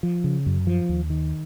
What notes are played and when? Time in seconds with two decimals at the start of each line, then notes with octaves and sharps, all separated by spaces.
0.03 F3
0.24 C#3
0.46 F#2
0.67 F3
0.89 D#2
1.10 D#3